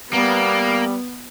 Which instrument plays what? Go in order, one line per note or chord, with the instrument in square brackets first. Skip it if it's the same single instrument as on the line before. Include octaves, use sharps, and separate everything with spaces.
[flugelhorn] G3 [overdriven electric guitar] A#3 [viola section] B3